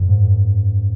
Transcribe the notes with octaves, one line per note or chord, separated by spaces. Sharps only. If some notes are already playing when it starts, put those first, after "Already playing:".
Already playing: F#2
G#2
F#2